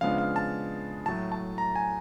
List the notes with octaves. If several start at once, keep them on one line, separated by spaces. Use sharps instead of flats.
C#3 F3 G#3 B3 D4 F5
F5
A5
A2 F#3 A3 A5
A5
A#5
G#5